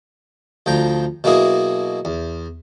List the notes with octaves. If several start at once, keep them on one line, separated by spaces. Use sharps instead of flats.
D2 F3 G5 A#5
B2 F#3 A#3 E4 G#4
E2